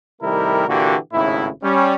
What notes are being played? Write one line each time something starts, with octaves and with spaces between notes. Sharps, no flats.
C3 D#3 G3 A3 E4 A#4
A#2 D3 E3 A#3 F#4 G4
G#1 A2 C#3 D#4 E4
G3 C#4